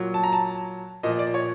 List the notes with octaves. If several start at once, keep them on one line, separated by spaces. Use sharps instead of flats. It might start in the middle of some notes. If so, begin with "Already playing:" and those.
Already playing: A#2 F#3
A5
A#5
A5
A#2 F3 D#5
D5
C#5